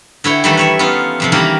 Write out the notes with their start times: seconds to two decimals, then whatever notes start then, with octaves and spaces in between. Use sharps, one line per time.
0.24 D3 E4 C#5 G5
0.44 D#3 E3 G3 A3 A4 B4
0.57 B4 C#5 E5
0.79 B3 C#4 D#4 F4
1.20 F2 C3 F3
1.32 D#3 E3 G3 A#3 C#4 A#4